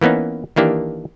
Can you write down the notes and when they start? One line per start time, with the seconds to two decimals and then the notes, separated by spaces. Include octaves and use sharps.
0.01 E3 A#3 B3 C#4 D#4
0.56 D#3 E3 A#3 D4 G4